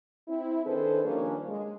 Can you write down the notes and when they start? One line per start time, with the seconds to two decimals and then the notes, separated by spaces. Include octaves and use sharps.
0.28 C4 E4
0.65 D#3 D4 G#4 A4 B4 C5
1.04 D#2 F3 G3 A#3 C#4 D4
1.48 G#3